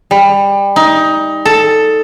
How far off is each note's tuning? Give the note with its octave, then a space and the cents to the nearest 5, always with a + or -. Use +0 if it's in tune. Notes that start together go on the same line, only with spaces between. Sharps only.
G3 +25
D#4 +20
A4 +5